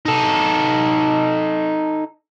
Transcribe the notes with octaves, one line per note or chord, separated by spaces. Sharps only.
D#4 A4